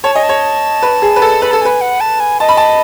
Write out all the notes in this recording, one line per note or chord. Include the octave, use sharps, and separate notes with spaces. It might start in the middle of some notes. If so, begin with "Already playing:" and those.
C#5 A5
D#5 G#5
A5
C#5
B4
G#4
B4
A4
B4 B5
A4 A5
B4 G#5
F#5
A5
G#5
D#5 A5
B5
A5